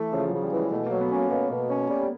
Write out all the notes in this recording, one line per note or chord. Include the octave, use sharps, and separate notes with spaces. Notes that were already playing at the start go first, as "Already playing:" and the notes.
Already playing: E3 A3
C#3 F3
C#3 F#3
G3
E3 G#3
B2 A3
F#3 A#3
B3
C#4
A#3
B2 A#3
B2
C#4
G3